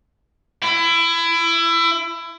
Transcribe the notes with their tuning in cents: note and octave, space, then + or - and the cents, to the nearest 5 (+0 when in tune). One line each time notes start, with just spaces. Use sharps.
E4 +25